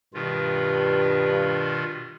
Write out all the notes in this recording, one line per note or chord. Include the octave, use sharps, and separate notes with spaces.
G2 B2 D#3 F4